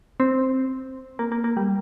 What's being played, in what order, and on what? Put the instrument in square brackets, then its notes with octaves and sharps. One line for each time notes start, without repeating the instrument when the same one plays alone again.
[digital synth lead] C4
A#3
A#3
A#3
G3